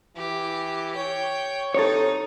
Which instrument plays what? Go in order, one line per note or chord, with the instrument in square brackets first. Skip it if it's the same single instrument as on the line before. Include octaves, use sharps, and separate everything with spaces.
[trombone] E3 [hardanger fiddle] G4
[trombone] C#5 [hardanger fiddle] G5
[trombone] C3 [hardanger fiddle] D#4 [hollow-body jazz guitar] A4 C#5